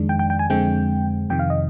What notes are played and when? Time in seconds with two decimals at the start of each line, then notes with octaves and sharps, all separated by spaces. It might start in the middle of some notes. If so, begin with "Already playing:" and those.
Already playing: F2 D#3 G#3 D4
0.09 G5
0.19 G5
0.30 G5
0.39 G#5
0.50 F2 D3 G#3 C4 G5
1.30 F2 C3 D#3 G5
1.39 F5
1.50 D#5